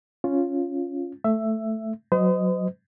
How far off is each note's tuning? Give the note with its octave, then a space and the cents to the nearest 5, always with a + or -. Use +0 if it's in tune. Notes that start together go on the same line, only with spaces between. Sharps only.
C#4 +0 F4 +0
A3 +0 E5 +10
F#3 -5 C5 -45 D#5 +0